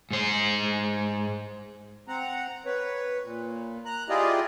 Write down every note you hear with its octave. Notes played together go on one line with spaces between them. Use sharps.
G#2 C5
C4 F#5 A#5
B4 C#5
A#2
A#5 F#6
E4 F4 G4 G#4 D5 D#5